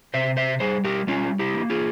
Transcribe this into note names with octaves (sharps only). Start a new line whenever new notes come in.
C3 C5 E5
C5 E5
G3 G#4 C5
G4 A#4
G3 C#4 F4
E4 G4
A#3
F4 G#4